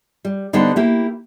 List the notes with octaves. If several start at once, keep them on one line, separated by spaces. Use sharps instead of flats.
G3
D3 G3 B3 D#4 C5
A#3 E4 G4